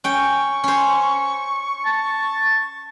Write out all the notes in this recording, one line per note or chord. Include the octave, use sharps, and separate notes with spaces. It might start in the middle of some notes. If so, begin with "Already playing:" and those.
C#4 G5 C#6
C#4 C5
A5